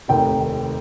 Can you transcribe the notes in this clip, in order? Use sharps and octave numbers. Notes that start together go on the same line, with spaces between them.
F1 D#2 D#3 G5